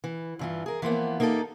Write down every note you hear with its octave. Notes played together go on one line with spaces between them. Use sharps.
E3
G2 E3 F4
G#4 A#4
E3 F3 A#3 B3
A#3 D#4 E4 G4 A4